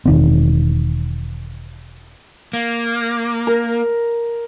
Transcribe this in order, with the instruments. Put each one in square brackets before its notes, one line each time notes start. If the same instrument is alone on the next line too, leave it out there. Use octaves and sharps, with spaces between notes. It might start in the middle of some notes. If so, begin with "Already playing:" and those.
[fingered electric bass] E1 D#3 C4
[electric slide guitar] A#3
[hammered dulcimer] A#4